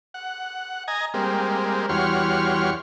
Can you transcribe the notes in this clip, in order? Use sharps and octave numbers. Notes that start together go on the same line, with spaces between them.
F#5
D#5 G#5 A#5
G3 G#3 A#3 C4
E2 G3 F#4 C#5 C6 F6